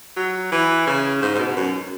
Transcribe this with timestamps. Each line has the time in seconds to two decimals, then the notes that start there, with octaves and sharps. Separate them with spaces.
0.16 F#3
0.52 E3
0.87 C#3
1.22 G#2
1.34 G#2
1.39 B2
1.56 F#2